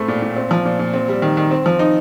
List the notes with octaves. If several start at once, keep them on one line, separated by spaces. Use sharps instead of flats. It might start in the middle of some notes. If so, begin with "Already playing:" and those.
Already playing: A2 A3 C4
A#2
A#2
C4
F3
A#2
A#2
C4
G3
D#3
D#3
C4
F3
D#4